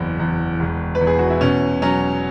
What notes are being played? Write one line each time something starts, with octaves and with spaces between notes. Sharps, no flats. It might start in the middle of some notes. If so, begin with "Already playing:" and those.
Already playing: F#1 E2
E2
E1
B4
E2
G#4
F#4
E4
B2 C#4
F#3 C#4